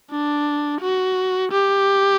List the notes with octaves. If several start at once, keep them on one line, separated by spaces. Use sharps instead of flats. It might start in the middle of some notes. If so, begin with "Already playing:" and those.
D4
F#4
G4